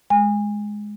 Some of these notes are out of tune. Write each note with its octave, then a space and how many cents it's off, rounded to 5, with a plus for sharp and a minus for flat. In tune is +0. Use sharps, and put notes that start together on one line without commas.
G#3 +5 G#5 -25